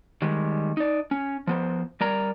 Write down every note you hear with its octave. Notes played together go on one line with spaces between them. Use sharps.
D#3 G3 G#3
D#4 D5
C#4
F3 B3 C5
G3 A#4 D5 A#5